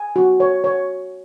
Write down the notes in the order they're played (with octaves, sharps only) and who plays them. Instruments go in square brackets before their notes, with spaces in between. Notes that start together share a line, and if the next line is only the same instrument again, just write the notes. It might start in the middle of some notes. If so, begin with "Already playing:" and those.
Already playing: [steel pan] G#5
F#4
C#5
C#5